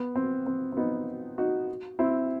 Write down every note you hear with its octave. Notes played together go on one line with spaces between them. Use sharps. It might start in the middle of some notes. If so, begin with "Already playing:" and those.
Already playing: B3
C4
C4
C4
B3 D#4
D#4 F#4
C4 E4